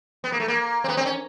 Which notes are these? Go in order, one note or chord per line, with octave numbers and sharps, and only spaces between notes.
B3
A#3
A3
A#3
C4
B3
C4
C#4